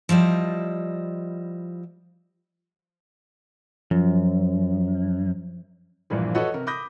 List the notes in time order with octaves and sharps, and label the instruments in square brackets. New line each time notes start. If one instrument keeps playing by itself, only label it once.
[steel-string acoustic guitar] F3 G3 E4 D#5
[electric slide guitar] F#2 [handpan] F3
[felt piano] A#1 G2 A#2 E3 F3
F#4 A4 B4 C#5 D#5 F#5
C3 A#4
B5 D6 D#6 G6 A#6